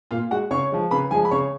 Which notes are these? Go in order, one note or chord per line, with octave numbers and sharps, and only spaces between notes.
A#2 F4 F5
G#3 F#4 F#5
C#3 C#5 C#6
F3 G#3
C#3 B4 B5
F3 G#3 G#4 G#5
B5
C#3 C#5 C#6